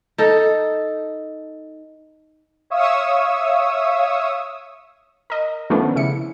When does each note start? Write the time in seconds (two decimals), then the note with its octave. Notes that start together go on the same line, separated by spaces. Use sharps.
0.18 D#4 A4
2.70 C#5 E5 F5 C#6 D#6 E6
5.30 A#4 D#5
5.70 D#3 F3 A3 B3 C#4 D4
5.96 C#3 E4 C#7